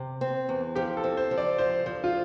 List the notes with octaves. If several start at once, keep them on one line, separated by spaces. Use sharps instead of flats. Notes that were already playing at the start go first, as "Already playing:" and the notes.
Already playing: C3
C4
E2
F3 G4
A4
C4
C5
F3
D5
F3 C5
F3 C5
F4